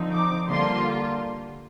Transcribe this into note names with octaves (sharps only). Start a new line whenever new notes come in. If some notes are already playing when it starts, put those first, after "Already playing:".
Already playing: D3 F3 C4 D#4
D6
D3 G3 A#3 F4 C6